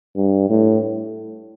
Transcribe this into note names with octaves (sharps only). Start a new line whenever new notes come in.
G2
A2